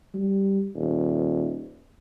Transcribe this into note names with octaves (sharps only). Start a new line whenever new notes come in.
G3
D#1